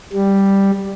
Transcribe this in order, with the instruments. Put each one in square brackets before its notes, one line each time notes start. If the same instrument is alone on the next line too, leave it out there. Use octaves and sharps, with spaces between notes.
[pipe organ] G3